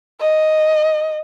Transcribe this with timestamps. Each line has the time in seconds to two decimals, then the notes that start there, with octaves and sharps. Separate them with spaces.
0.21 D#5